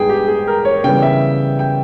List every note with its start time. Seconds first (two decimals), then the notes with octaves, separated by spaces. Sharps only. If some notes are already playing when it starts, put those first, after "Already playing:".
Already playing: G#2 G3 B3 G#4 G5
0.09 G4
0.28 G#4
0.47 A#4
0.65 C#5
0.84 C#3 E3 G3 B3 G5
1.02 E5
1.59 G5